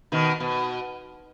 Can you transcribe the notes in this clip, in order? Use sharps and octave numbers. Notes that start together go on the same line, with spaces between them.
B2 D#3
B2